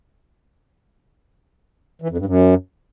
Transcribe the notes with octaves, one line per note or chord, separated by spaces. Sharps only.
E3
F2
G2
F#2